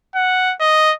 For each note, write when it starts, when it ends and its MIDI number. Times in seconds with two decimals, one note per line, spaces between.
0.15 0.54 78
0.60 0.93 75